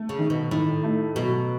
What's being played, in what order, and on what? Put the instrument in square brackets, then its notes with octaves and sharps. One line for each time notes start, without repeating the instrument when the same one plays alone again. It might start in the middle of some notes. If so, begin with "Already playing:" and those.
Already playing: [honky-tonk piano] A3
[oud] C#3
[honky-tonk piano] D#3
[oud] B2
[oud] A2 [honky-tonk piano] D#3
[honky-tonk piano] A3
[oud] B2 [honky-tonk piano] F#3